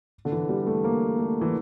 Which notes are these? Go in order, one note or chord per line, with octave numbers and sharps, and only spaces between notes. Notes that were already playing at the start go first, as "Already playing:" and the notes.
D3
E3
G3
A3
A#3
A3
E3